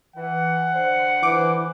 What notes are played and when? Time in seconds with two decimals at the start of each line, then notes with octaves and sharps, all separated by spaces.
0.16 E3 F#5
0.75 D3 C5
1.23 E3 D6